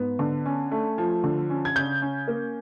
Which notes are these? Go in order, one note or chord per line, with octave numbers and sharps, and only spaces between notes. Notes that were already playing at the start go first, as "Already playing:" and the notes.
Already playing: G#2 B3
D3
C#4
A3
F3
D3
C#4
G#6
C#3 G6
C#4
A#3